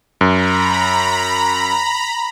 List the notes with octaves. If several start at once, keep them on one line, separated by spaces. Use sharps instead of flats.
F#2 A#5 B5